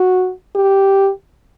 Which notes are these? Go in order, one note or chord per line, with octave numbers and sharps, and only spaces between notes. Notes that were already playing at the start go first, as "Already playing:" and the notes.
Already playing: F#4
G4